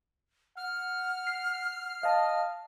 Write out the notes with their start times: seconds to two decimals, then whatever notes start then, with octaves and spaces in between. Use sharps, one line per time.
0.57 F#5 F6
1.27 C7
2.03 D#5 F5 A5